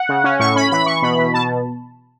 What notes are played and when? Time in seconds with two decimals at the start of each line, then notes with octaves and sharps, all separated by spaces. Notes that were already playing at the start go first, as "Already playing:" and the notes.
Already playing: F#5
0.09 C#3
0.24 C#4
0.39 A2 C#6
0.56 C#4 B5
0.71 E3 B5
0.86 E3 C#6
1.02 B2 B5
1.18 B2
1.34 B2 A5